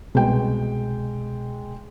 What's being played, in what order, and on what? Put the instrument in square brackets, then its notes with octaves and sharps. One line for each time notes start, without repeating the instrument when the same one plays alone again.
[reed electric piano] C2 B2 [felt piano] G#3 G5